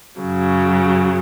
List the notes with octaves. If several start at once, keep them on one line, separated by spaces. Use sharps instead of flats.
F#2 C#3 F#3